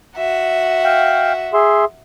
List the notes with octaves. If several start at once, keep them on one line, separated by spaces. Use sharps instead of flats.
F#4 E5
F5 G5
G#4 E5 C6